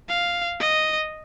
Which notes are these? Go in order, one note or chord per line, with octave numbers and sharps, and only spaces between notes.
F5
D#5